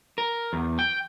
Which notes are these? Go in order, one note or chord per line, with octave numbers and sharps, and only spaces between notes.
A#4
E2
G5